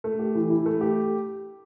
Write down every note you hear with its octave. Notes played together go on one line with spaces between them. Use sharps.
A3
G4
E3
E4
A3
G4